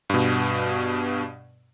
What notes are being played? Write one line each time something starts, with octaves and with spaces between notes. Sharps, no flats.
G2 B2